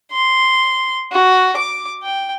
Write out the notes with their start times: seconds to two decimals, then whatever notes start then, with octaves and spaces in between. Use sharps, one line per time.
0.12 C6
1.12 F#4
1.57 D6
2.03 G5